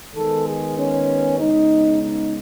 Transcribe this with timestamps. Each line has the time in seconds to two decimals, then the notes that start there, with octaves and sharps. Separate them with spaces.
0.16 D#3 G#3 B3 A4
0.47 G#4
0.77 C#4
1.39 C#3 G#3 B3 D#4
2.01 D#4